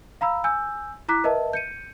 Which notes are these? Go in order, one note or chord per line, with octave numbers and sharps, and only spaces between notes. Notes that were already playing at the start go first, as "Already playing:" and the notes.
F5 A#5 B5 E6
G#5 E6 G6
E4 A#5 D6 F#6 B6
A#4 B4 D#5 E5 A5
G6 C#7 D#7